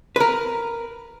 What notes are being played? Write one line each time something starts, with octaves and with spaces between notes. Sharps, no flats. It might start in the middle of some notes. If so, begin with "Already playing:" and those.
A#4 B4